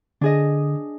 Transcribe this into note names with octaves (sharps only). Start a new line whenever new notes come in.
D3 D4 G#4 D#5